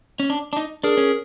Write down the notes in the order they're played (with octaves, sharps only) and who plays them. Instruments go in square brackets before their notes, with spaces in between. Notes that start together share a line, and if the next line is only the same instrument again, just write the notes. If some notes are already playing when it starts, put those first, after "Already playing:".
[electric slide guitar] C#4
D4
D4
D#4
[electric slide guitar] D4 [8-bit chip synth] G#4 A#4
[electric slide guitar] C#4